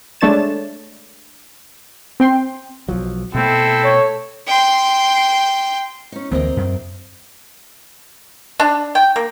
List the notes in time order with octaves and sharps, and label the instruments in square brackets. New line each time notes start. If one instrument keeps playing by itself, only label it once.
[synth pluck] G#3 A3 D4 C#5 A6 E7
C4 G5 C6
[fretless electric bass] B1 F3 F#3
[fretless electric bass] B2 A3 [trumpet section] C4 E4 [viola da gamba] A4
[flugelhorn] C#5
[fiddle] G5 C6
[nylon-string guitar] C#4 D#4
[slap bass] D2 E3 A#3 [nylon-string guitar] C4 A#4 D#5
[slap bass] F#2
[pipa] D4
G5
A#3